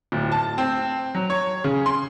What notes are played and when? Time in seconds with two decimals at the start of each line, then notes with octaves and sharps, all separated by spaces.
0.12 D1
0.32 A5
0.58 C4
1.15 F#3
1.30 C#5
1.64 C#3
1.86 C6